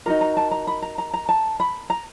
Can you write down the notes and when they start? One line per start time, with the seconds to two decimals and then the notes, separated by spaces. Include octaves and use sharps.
0.06 D#4 F#4 A#4 A#5
0.21 A#5
0.37 A5
0.51 A#5
0.67 B5
0.82 A#5
0.98 A#5
1.14 A#5
1.29 A5
1.60 B5
1.90 A#5